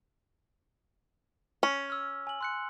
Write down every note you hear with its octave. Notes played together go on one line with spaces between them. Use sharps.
C#4
E6 F6
G#5 F#7
C6 F#6 C#7